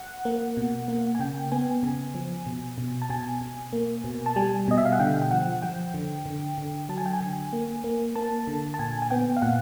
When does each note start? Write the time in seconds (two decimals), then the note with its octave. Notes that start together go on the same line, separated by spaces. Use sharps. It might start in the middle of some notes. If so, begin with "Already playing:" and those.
Already playing: F#5
0.25 A#3
0.57 B2
0.88 A#3
1.15 G#5
1.19 C#3 G5
1.52 B3 G#5
1.83 C#3 G#5
2.15 F3
2.46 B2
2.78 B2
3.02 A5
3.10 B2 G#5
3.41 B2
3.73 A#3
4.04 B2
4.26 A5
4.36 G3 G#5
4.68 B2 D#5
4.78 E5
4.85 F5
4.92 F#5
4.99 D3 G5
5.22 G5
5.31 F3 F#5
5.62 F3 G5
5.94 D3
6.26 D3
6.58 D3
6.89 F#3 A5
6.97 G#5
7.06 G5
7.14 G#5
7.21 D3
7.53 A#3
7.84 A#3
8.15 A#3 A5
8.47 D3
8.74 A5
8.79 A#2 G#5
9.02 G#5
9.11 B3 G5
9.37 F5
9.42 A#2 F#5